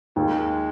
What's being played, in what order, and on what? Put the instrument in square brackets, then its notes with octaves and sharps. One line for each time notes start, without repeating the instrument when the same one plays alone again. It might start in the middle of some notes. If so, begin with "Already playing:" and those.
[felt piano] D#2 [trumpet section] G#3